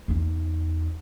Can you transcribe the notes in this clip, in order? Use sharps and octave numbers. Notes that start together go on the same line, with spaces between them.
E2 D#4